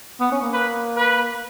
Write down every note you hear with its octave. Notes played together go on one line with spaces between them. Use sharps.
B3
C#4
A#3
B4
B4